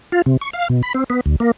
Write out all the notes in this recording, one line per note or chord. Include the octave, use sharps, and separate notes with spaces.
F4
C3
C#6
F5
B2
B5
C4
B3
D2
A#3